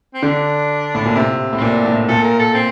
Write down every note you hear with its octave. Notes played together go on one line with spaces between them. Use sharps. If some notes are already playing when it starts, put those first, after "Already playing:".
C4
D3 D4
A2
A#2
C3
A2
C4
A#2 D4
A2
A#2 A4
A#4
A4
C4